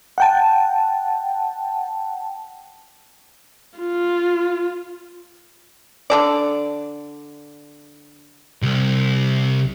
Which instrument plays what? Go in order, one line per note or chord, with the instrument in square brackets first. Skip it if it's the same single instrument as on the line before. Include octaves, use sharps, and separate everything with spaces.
[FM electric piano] F#5 G5 A5
[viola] F4
[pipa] D3 A4 D5
[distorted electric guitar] C2